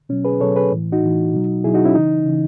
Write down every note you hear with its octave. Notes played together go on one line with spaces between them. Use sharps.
B2 F#3 C#4
G#4 B4
B2 F#3 A4 C#5
G#4 B4
A2 E3
D#4 F#4
A2 E3
B2 F#3
B2 F#3 E4 G#4
D#4 F#4
C#4 E4
C#3 E3 D#4
C#3 E3